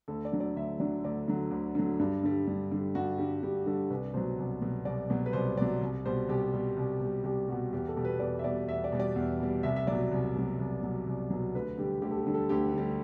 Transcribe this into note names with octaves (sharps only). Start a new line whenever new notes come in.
D2 A4
D5
D3 F#3
D5
D2 E5
D3 F#3 D5
D2 D5
D3 F#3
D2
D3 F#3
G2
D3 G3
G2
D3 G3
G2 F#4
D3 G3 G4
G2 G4
D3 G3 A4
C2 B4
B2 F#3 C5
C2
B2 F#3
C2 D5
B2 F#3
B4
C2 C5
B2 F#3 D5
C2
B2 G3 C5
C2 G4
B2 G3
C2
B2
G3
C2 G4
B2 G3 F#4
E2 G4
A4
B2 G3
B4
E2 D5
E5
B2 G3 D5
E2 E5
D5
B2 G3
D5
E2
B2 G3
C2 E5
E5
B2 F#3 D5
C2
B2 F#3
C2
B2 F#3
C2
B2 F#3
D2 B4
D3 G3 G4
D2 G4
A4
G4
D3 G3
A4
D2 G4
D3 G3